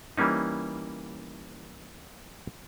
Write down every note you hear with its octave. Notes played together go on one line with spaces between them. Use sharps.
E3 G3 A#3 C#4 D#4